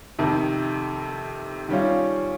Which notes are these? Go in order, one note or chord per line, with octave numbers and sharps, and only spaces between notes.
F2 C3 D#3
D#3 G3 C#4 F4